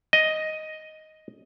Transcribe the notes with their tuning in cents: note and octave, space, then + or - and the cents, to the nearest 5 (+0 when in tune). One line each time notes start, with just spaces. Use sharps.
D#5 +5